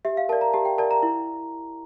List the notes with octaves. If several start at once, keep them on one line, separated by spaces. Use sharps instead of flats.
G4 E5
F5
A#4 D5 A5
A#5
G4 A5
G5
A#4 D5 A5
A#5
E4